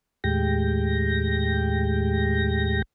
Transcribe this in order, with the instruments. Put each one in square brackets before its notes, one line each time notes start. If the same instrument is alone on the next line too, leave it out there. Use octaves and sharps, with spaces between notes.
[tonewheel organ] D#2 A2 G#3 G4 G5 A#6